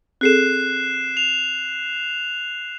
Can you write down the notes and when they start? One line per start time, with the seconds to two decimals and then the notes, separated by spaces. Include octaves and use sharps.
0.21 C4 G#4 A4 F#6 C7 E7
1.17 F7